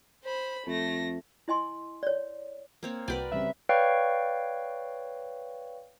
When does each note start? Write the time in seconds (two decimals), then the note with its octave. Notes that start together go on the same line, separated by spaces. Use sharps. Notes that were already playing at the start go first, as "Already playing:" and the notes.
0.24 C5 B5
0.67 F2 A3 A#6
1.48 E4 D#5 G#5 C6
2.03 C#5 D5
2.83 A#3 C4 C#5
3.08 C2 F#4 A#4 B4 D5 G5
3.32 C#3 G3 C4 E5
3.69 B4 C#5 D5 F5 G5 C#6